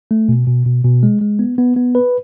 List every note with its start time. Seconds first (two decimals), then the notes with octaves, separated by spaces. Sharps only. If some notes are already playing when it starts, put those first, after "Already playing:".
0.11 A3
0.29 B2
0.47 B2
0.66 B2
0.84 B2
1.03 G#3
1.21 G#3
1.39 B3
1.58 B3
1.77 B3
1.95 B4